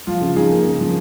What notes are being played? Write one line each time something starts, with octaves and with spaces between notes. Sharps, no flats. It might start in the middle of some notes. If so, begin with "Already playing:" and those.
F3 F4
C#3 F4
F3 D#4 G#4
A#3
C#3
F3